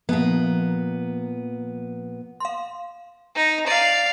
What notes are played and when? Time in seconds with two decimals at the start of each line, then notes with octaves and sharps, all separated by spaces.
0.09 A#2 F3 A#3 B3
2.40 F5 C6
3.36 D#4
3.67 D5 F5